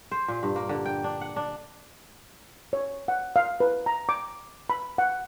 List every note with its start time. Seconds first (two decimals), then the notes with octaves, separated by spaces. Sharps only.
0.12 C5
0.28 A#2
0.43 G2
0.56 A#3
0.69 D3
0.85 G5
1.04 D4
1.21 F#5
1.36 D4
2.73 C#5
3.08 F#5
3.36 F5
3.60 B4
3.86 A#5
4.09 D6
4.70 B5
4.98 F#5